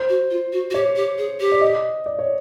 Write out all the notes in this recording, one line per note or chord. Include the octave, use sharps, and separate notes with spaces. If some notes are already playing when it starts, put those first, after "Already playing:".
Already playing: C5
F#4
F4
F#4
F#4
G4 C#5
G4
G#4
G4
D5
D#5
D5
C#5